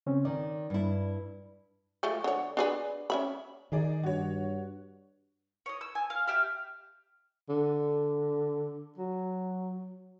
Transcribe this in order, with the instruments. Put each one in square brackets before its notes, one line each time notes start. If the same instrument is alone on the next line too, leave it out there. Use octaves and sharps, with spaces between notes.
[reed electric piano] C#3 C4 C#4
[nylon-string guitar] D#3 [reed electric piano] D5
[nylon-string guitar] G2 E4
[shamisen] F3 G#3 A3
D3 C#5
D4 G#4 B4
C#4 E5 B5
[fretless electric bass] D#3 [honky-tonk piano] D#4 G#4 D5
[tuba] G2 [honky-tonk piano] F#4 C#5
[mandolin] C#5 D#5
E6
G#5
F5
G4 E5 F6
[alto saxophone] D3
F#3